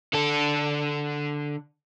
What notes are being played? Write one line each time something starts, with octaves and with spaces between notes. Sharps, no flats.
D3 A4